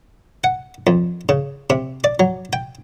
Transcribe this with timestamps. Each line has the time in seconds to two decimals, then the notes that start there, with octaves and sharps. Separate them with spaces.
0.44 F#5
0.87 F2
1.29 C#3
1.70 C3
2.04 D5
2.20 F#3
2.53 G5